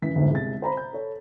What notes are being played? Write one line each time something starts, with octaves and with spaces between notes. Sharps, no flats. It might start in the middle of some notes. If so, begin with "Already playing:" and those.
F#2 E3 B6
G1 D2 G#2
C2 G#3 A6
C5 A#5 B5
G6
A4 C#5